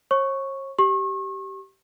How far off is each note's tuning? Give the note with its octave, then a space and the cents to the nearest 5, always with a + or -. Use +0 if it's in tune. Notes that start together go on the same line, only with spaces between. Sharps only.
C#5 -45 C#6 +0
G4 -20 C#6 -35